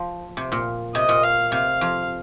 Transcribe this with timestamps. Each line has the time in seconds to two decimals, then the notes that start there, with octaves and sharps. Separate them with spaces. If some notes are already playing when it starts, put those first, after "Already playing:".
Already playing: F3
0.37 C3
0.52 A#2
0.95 C3 D#5
1.09 A#2
1.23 F5
1.52 C3 F5
1.81 F2